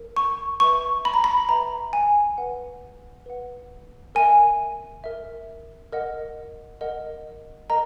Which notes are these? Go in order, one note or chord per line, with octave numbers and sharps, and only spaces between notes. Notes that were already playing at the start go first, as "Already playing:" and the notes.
Already playing: A#4
C#6
B4 E5 C#6
B5
A#5
B5
B4 E5 A#5
G#5
B4 F#5
B4 F#5
A#4 E5 G#5
A#4 E5
A#4 D#5 F#5
A#4 D#5 F#5
A#4 D#5 A#5